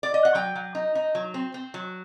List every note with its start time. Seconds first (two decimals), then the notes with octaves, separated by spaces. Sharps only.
0.03 D5
0.14 D#5
0.25 F#5
0.35 F#3 G5
0.55 F#3
0.75 D#4
0.95 D#4
1.15 F#3
1.34 C4
1.54 C4
1.74 F#3